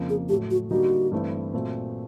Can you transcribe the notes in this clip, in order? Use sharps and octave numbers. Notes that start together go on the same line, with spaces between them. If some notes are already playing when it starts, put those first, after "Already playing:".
Already playing: F2 C#3 F3 A#3
G#4
A2 F#3 A3 G4
F#4
D3 G3 A#3 D#4 F#4
G2 E3 A3 C4 E4
A#2 F#3 A3 C4